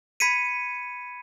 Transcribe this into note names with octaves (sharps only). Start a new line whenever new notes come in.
B5 G#6 B6 C#7 D#7